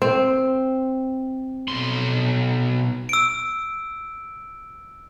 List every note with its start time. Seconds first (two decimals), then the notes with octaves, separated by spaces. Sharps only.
0.02 C4
1.68 B1 C6
3.09 E6 D7